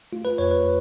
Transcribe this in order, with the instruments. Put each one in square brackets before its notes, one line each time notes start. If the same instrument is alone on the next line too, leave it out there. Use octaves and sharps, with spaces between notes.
[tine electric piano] A3 F4
B4
F2 C#5
B4